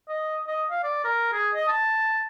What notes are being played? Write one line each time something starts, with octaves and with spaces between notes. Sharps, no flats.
D#5
D#5
F5
D5
A#4
G#4
D#5
A5